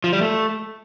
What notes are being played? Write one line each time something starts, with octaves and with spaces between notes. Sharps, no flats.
F3
G3
A3